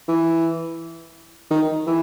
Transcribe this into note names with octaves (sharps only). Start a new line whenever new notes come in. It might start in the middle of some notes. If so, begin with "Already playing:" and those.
E3
D#3
E3